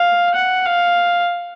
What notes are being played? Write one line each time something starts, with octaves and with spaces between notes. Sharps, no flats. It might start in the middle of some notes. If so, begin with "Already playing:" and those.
Already playing: F5
F#5
F5